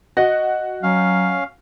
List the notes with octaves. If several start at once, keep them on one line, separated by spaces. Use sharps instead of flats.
F#4 D#5
F#3 C#4 F5